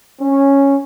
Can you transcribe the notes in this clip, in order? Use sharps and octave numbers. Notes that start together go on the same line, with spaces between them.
C#4